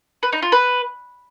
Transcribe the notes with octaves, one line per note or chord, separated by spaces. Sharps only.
B4
D#4
F4
B4